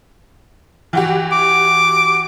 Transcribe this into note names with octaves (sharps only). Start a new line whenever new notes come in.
E3 F#4 G4
D6